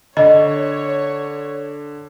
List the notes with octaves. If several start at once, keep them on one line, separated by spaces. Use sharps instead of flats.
D3 C#5 D#5